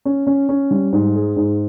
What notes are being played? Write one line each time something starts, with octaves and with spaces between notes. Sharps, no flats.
C#4
C#4
C#4
G3
G#2
G#4
G#2